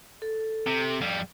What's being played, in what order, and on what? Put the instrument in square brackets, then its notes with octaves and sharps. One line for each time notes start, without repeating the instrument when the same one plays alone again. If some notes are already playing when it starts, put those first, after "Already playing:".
[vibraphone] A4
[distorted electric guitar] C3
F2 G3